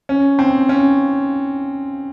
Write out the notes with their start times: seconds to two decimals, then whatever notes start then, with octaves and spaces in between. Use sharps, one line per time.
0.09 C#4
0.39 C4
0.69 C#4